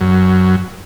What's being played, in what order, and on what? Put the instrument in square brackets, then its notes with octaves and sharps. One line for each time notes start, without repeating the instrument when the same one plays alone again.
[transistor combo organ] F#2